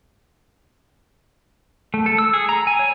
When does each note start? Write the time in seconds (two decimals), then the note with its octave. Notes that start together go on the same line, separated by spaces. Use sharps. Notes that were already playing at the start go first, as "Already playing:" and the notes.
1.94 A3
2.06 A4
2.18 E6
2.33 G#4
2.49 A#5
2.67 G#5
2.79 C#5